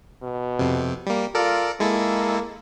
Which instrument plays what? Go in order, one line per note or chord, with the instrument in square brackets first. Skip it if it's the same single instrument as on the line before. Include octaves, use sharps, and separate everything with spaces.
[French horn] B2
[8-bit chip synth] F2 C3
G3 A#3
[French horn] F4 [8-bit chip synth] A4 A#4 D5
[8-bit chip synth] G#3 E4 A4 [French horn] A#3